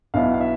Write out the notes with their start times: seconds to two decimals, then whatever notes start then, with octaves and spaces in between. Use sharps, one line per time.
0.14 B1 B2 B3 E4 F5
0.34 F5
0.40 E5